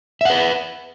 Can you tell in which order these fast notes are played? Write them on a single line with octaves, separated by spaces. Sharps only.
E5 F#5 B4